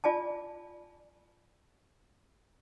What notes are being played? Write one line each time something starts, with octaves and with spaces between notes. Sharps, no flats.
F4 D5 G#5 A5